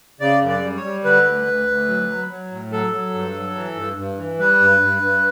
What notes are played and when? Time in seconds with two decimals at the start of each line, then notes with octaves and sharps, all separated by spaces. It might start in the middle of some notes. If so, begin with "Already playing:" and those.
0.20 C#3 D5
0.42 F#2
0.49 D5
0.63 G3
0.77 C#5
0.84 G3
1.05 D3 B4
1.26 D2
1.47 D2
1.67 D2
1.88 F#3
2.09 F#3
2.30 F#3
2.52 A2
2.72 F#3 A4
2.93 F#3
3.14 G2
3.34 F#3
3.56 E3
3.76 G2
3.97 G2
4.18 E3
4.39 G3 B4
4.60 G2
4.81 G2
5.02 G2